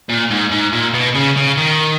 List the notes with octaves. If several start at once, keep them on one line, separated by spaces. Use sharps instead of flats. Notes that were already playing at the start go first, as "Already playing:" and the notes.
A#2
G#2
G#2
A#2
B2
C#3
C#3
D#3